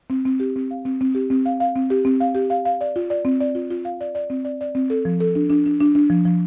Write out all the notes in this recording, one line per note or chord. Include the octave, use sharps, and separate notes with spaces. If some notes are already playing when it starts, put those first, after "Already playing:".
C4
C4
G4
C4
F5
C4
C4
G4
C4
F5
F5
C4
G4
C4
F5
G4
F5
F5
D5
F4
D5
C4
D5
F4
F4
F5
D5
D5
C4
D5
D5
C4
A4
F3
A4
D4
D4
D4
D4
D4
F3
F3